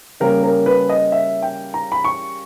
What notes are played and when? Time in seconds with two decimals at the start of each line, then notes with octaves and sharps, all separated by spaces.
0.20 C#3 G3 A#3 C#4 A#4
0.43 A#4
0.66 B4
0.89 D#5
1.12 E5
1.42 G5
1.74 A#5
1.92 B5
2.04 C#6